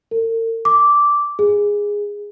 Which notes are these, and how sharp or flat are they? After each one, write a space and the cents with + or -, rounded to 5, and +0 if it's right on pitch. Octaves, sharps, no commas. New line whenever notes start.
A#4 -45
D6 -10
G#4 -10